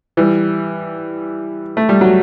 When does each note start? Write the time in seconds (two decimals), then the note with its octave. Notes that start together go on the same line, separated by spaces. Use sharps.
0.17 E3 G3
1.77 A3
1.89 G3
2.01 F#3